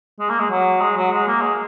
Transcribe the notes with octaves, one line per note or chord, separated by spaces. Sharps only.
G#3
A#3
G#3
F#3
G#3
F#3
G#3
A#3
G#3